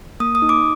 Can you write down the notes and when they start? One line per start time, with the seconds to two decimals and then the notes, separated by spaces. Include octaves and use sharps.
0.20 A#3 D#6
0.35 D#6
0.42 D#4
0.49 D6